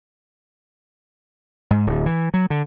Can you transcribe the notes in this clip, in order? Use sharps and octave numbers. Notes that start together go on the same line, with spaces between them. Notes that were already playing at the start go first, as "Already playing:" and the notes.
G#2
D1
E3
F#3
D3